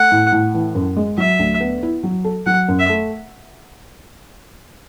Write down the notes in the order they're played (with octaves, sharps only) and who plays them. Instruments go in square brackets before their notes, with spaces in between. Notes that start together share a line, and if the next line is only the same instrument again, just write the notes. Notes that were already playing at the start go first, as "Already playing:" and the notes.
Already playing: [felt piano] A3 [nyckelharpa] F#5
[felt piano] A2
A2
E3
F#2
G#3
[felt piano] F#3 [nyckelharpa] E5
[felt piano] D2
B3
E4
F#3
A4
[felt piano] F#3 [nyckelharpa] F#5
[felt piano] F#2
[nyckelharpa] E5
[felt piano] A3